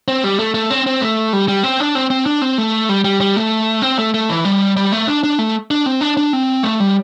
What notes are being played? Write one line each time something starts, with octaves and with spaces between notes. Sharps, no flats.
C4
G3
A3
A3
C4
C4
A3
G3
G3
C4
D4
C4
C4
D4
C4
A3
G3
G3
G3
A3
C4
A3
A3
E3
G3
G3
A3
D4
D4
A3
D4
C4
D4
D4
C4
A3
G3